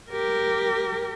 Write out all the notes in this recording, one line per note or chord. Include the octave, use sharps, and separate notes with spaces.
G4 A#4